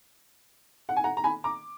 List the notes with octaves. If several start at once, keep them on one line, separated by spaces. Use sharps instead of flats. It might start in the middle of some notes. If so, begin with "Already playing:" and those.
F#5
G#5
F#5 A#5
A#5
G#5 B5
A#5 D6